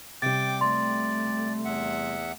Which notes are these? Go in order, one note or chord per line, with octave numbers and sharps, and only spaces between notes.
C3 G3 G5 D6 A6
A3 D5 C6
E2 E5 F#5